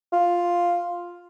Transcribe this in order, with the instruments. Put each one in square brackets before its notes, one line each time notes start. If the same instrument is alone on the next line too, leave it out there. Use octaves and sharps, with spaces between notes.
[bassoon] F4